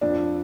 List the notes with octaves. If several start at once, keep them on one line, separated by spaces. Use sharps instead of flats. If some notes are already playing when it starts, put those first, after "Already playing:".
F2 D4